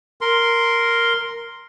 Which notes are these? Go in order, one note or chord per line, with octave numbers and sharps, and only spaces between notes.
A#4 C6